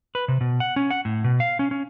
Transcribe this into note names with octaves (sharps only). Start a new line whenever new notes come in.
B4
C3
B2
F#5
C#4
F#5
A2
B2
F5
C#4
C#4